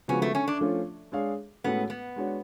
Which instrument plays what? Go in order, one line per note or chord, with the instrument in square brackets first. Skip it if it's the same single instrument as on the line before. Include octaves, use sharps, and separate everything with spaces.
[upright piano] C#3 F3 G#3 B3 F#4 [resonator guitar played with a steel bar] C#4
[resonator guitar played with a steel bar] A3
C#4
D4
[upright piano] F3 A3 C#4 F4
G#3 D4 G#4 C#5 F5
[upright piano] A2 G#3 C#4 F#4 A4 [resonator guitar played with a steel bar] B3
[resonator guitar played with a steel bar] B3
[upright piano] G#3 D4 F#4 C#5